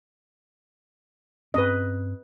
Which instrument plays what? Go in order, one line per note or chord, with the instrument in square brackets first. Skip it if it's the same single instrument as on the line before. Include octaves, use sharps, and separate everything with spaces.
[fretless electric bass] G2 C4 C#4 [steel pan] B4 D#5